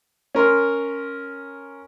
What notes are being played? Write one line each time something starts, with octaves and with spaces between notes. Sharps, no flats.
C#4 A#4 C6